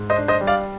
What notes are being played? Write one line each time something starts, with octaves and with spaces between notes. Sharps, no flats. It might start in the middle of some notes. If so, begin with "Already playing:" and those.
Already playing: G#2
C5 D#5
D4
C5 D#5
G3
D5 F5